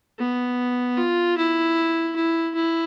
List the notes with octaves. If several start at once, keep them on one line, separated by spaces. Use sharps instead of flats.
B3
F4
E4
E4
E4